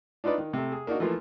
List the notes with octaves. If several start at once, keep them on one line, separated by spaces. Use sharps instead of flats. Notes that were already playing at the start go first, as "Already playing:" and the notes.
D4 D#4 F4 B4 D5
D#3
C3 A3
G#4
A#3 D4 D#4 F#4
E3 F3 A3 A#3 F4